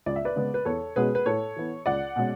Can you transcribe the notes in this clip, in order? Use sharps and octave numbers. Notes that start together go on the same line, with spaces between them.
C#2 D5
E5
B4 D5
C#3 G#3 B3
B4
E2 A4 C#5
B2 G#3 C#4 G#4 B4
B4
A2 A4 C#5
E3 B3
C#2 D5 F#5
B2 G#3 C#4